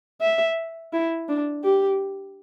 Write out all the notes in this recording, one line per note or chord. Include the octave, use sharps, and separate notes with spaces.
E5
E4
D4
G4